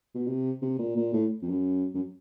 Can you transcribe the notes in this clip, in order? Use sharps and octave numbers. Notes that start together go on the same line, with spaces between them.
B2
C3
C3
A#2
A#2
A2
F2
F#2
F#2